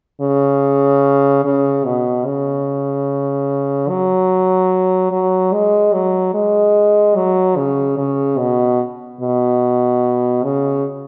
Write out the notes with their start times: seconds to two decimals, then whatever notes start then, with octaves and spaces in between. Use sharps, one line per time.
0.21 C#3
1.45 C#3
1.85 B2
2.26 C#3
3.89 F#3
5.11 F#3
5.53 G#3
5.93 F#3
6.34 G#3
7.16 F#3
7.57 C#3
7.98 C#3
8.38 B2
9.21 B2
10.43 C#3